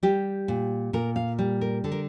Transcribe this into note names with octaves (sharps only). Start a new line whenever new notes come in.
G3 G4
A#2
A#2 A#4
F5
G3
A#4
D3 A4
A#4